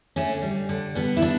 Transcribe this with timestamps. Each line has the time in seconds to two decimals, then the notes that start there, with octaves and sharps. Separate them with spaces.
0.16 D3 A3 C#4
0.42 G3
0.69 D3
0.95 G3 B3
1.17 E4
1.22 G3 B3 D4